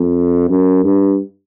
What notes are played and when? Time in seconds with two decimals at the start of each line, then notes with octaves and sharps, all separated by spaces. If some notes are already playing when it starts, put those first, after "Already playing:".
Already playing: F2
0.50 F#2
0.84 G2